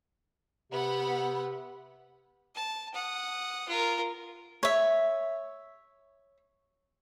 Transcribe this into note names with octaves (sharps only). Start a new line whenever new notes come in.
C3 B3 F#5 B5
A5
F#5 D#6
F4 A#4
C#5 E5